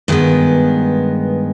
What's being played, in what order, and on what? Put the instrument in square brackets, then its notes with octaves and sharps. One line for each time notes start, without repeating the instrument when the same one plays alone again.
[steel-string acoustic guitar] G2 D#3 G#3 B3